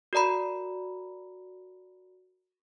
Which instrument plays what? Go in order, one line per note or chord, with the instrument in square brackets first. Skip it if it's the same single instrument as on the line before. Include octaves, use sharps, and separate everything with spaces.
[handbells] F#4 A#4 D5 A#5 B5